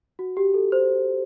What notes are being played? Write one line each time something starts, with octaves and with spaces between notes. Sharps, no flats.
F#4
G4
A4
C5